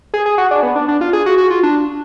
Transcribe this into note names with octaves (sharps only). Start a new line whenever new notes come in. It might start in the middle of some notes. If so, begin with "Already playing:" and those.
G#4
G#4
F#4
D4
B3
D4
D4
F4
G#4
F#4
F#4
F4
D4